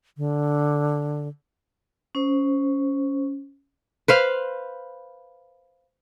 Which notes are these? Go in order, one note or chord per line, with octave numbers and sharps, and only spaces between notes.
D3
C#4 C5
B4 C5 F5